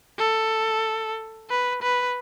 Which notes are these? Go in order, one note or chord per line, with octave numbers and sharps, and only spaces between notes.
A4
B4
B4